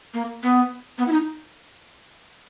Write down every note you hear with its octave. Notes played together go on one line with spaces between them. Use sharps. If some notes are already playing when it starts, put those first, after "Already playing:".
A#3
B3
B3
E4
D#4